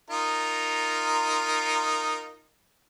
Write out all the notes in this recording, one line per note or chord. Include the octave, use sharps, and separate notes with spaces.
D#4 F4 A#4